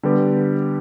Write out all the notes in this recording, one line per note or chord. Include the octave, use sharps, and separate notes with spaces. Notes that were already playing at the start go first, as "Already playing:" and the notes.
D3 G3 B3 G4 B4